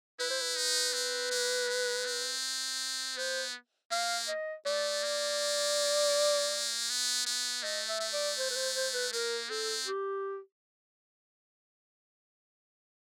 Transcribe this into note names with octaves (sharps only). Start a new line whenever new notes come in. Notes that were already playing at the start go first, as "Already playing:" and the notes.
E4 B4
C5
B4
D#4
C4
A#3
G#3
C4
B3 C5
A#3 F5
D#5
A3 D5
A#3
B3
B3
A3 D#5
E5
A3
D5
C5
B4
C5
C5
B4
A#3 A#4
C4 A4
G4